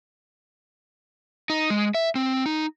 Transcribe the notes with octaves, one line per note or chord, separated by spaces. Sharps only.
D#4
G#3
E5
C4
D#4